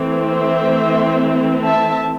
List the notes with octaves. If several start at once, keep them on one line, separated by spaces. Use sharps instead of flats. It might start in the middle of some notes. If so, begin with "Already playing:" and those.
Already playing: E3 A3 C4
C5 E5
E5 A5